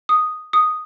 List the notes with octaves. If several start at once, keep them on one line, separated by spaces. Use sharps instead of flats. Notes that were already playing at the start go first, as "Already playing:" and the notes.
D#6
D#6